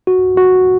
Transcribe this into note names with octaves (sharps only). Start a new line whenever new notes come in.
F#4
F#4